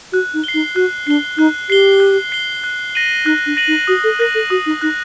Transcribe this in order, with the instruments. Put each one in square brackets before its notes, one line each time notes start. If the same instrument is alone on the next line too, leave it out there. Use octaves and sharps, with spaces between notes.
[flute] F#4 [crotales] F#6
[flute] D#4
[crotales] C7 G7
[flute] D#4
[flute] F#4 [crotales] F#6
[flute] D4 [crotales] C7 G7
[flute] D#4 [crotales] F#6
[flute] G4 [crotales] C7 G7
[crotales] F#6
C7 G7
F#6
A#6 D#7 F#7
[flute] D#4 [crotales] F#6
[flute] D4
[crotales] A#6 D#7 F#7
[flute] D#4
[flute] F#4 [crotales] D#6
[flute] A4
[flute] A#4 [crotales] F#6 A#6
[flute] A4
[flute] F#4 [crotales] D#6
[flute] D#4
[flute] D#4 [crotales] F#6 A#6